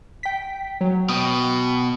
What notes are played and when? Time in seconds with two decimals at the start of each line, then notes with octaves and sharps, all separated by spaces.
0.23 G5 B6
0.81 F#3
1.09 B2 G5 D#6